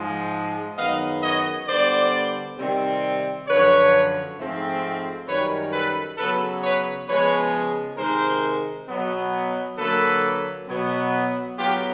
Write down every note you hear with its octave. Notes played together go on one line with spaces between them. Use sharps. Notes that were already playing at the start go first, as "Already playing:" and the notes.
Already playing: G#2 F3 G#3
F#2 D#3 G#3 B3 D#5 F5
C#5 D#5
D3 G3 B3 C5 D5
C3 D#3 G3 C4
F#2 D3 F3 B4 C#5
G#2 F3 A3 C4
F#2 D#3 G3 B4 C#5
A4 B4
C#3 F#3 B3 A4 B4
B4 C#5
C#3 F3 G#3 B3 B4 C#5
C3 D#3 G#3 A#4 C5
B2 F#3 B3
D3 F#3 A#3 A4 B4
B2 F#3 B3
A2 F#3 B3 F4 G4